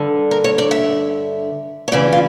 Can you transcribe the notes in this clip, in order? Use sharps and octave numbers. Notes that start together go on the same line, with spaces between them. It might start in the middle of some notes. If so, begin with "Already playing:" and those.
Already playing: G2 D3
A#4
C#5
D5
E5
C#5
D2 C#3 E3 D5
F4